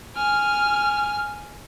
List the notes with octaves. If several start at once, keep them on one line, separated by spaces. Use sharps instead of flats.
G#5 F6